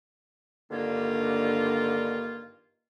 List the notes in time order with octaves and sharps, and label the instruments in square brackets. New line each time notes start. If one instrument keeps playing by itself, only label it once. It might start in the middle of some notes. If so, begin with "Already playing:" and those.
[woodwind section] G2 D3 D#3 A#3 F4